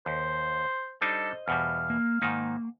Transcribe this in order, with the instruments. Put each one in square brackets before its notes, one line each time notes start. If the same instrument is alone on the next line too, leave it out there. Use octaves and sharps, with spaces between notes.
[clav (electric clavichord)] D#2 [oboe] C5
[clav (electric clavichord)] G3 D4 D#4 [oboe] A4 [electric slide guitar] C5 D#5
[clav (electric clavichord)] E2 B2 G3 [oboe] F5
[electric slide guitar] A#3
[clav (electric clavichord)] G#2 D#3 D#4 [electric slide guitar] A#3